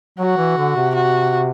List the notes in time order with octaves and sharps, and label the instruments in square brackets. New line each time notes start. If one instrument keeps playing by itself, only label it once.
[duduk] F#3 [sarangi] F#4
[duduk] E3
D3
C3
[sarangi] F#4